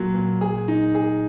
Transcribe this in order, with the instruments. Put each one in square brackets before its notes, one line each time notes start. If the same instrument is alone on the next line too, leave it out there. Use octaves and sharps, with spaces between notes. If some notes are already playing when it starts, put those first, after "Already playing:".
Already playing: [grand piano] A#2 F#3
A#2
G#4
D#4
G#4